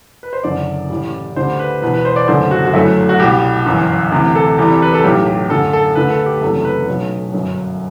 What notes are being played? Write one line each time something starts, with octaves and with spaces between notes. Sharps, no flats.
B4
C5
F#1 F#2 D3 D5
A1 A2 G3
D2 D3 G3 C5
B4
E1 E2 B2 B4
B4
C5
D5
F#1 F#2 D3 A3 C5
F#4
F#4
G1 F#2 F#3 A3 E4
F#4
C2 B2 G3 G4
G1 F#2 E3
D2 C3 E3
A4
E2 C3 E3 G3
B4
A4
B1 A2 F#3 G4
G4
F#2 D3 A3 A4
A4
D2 D3 A3 B4
A4
G4
F#1 E2 C3 F#3 A3 A4
B4
B1 B2 F#3 A3
G1 F#2 F#3